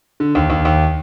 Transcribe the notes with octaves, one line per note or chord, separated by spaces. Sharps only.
D3
D#2
D#2
D#2